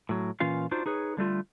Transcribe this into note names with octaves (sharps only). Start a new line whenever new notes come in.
A2 F#3
A#2 E3 C#4 F4 F5
D4 D#4 F4 F#4 C5
D#4 G#4 B4 C#5
D3 G3 A3 F4